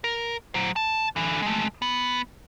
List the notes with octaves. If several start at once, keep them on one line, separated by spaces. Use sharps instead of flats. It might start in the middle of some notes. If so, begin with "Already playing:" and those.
A#4
F#3 C5
A5
D3 E3
G#3 A3
B3